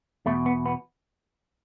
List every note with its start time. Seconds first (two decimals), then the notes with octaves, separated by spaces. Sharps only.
0.26 E2 B2 A3
0.46 B3
0.66 B3